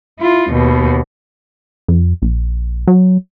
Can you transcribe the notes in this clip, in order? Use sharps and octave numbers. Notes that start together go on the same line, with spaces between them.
E4 F4
D#2 B2
F2
A#1
F#3